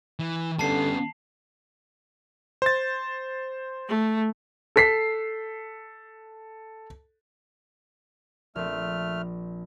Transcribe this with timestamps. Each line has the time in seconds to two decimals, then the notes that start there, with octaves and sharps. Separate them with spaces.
0.20 E3
0.59 D3 G3 B3 C#4 A5 C7
2.62 C5 A6
3.88 A3
4.76 A4 B6 C7
8.55 A#1 A3 C4 F6